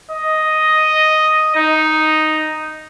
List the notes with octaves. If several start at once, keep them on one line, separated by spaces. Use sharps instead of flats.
D#5
D#4